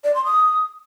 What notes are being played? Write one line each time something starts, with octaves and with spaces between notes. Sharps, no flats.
D5
C6
D#6